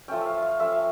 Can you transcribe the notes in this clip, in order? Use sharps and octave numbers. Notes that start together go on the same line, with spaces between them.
F3 A3 C#4 G5
E5 F5
F5
F3 A3 C#4 E5
F5